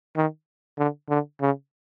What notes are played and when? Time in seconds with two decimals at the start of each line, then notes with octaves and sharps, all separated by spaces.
0.16 D#3
0.78 D3
1.09 D3
1.41 C#3